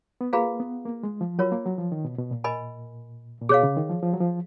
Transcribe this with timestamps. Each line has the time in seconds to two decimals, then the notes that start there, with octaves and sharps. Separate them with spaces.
0.21 B3
0.33 A#3 F4 G#4 B4 F5 A#5
0.60 B3
0.86 A#3
1.03 G#3
1.21 F3
1.39 F#3 F4 A#4 C#5
1.52 A#3
1.66 F#3
1.78 F3
1.92 D#3
2.05 B2
2.18 B2
2.31 A#2
2.44 A#4 D#5 G#5 B5
3.41 A#2
3.49 B2 G#4 C#5 F5
3.63 C#3
3.77 D#3
3.89 F3
4.03 F3
4.13 F#3
4.20 F3